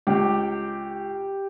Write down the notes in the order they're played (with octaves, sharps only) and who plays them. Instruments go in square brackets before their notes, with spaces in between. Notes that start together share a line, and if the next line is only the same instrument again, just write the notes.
[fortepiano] C#2 [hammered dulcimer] G4